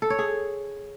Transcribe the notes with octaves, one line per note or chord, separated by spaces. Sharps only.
A4
C#5
G#4